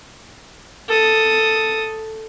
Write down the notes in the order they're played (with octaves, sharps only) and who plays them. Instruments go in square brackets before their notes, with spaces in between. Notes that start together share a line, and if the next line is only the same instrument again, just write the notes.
[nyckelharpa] A4 D#6